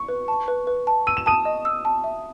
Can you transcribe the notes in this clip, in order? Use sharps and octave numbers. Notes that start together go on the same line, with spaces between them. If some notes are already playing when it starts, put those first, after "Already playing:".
Already playing: C#6
B4
A5
B4
B4
A5
E6 D#7
E7
A5 D#6 D#7
D#5
E6
A5
E5